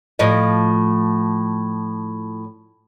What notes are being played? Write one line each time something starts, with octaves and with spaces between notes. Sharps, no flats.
A2 F3 D#5